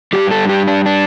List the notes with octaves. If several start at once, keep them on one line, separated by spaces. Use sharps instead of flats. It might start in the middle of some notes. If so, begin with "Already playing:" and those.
G2 E3 G3 G4
A4
G4
D4
D4